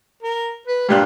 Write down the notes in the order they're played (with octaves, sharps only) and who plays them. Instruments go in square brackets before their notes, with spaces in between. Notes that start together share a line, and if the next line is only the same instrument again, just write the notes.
[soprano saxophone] A#4
B4
[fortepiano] G2 A#2 F#6 [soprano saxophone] G4